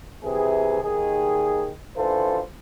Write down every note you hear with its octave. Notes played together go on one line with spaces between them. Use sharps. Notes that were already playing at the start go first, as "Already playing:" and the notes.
C3 E3 G#4
D#2 D#3 G#4
A1 D3 E3 F4 A4 C5